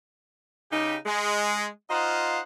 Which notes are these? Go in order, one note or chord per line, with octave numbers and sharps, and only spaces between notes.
C#3 D#4 G4
G#3
D#4 F4 C5 D#5 F5 F#5